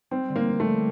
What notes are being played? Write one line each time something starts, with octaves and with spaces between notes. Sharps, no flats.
G3 C4
D3
A#3
G3
A3
G3